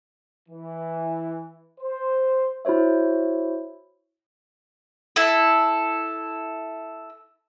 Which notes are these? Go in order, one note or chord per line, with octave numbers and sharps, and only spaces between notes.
E3
C5
E4 F#4 C5 C#5 E5
E4 A4